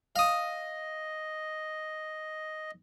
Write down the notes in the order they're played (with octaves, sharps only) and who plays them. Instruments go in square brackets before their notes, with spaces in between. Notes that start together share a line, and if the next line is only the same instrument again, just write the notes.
[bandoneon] D#5 [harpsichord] F5 D#6